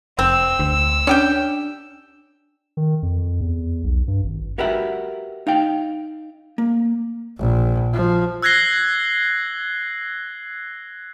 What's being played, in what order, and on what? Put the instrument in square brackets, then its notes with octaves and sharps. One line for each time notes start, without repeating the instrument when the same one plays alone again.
[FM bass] F1 [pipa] C4 [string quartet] E6
[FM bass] D2
[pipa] C#4 G4 G5 [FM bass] D4
[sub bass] D#3
F2
E2
B1
G2
G#1
[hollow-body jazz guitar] F#4 G4 A#4 B4 E5 F#5
D#4 F5 G5
A#3
[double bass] A#1
F3
[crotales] E6 F#6 G#6 A#6 C7 G7